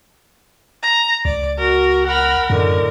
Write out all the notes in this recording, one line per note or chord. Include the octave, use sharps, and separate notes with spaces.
A#5
C#2 D5
F#4 A#4
A#4 F#5 B5 F6
F#2 A2 D3 D#3